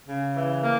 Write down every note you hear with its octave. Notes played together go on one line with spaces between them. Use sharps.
C#3
E3
A#3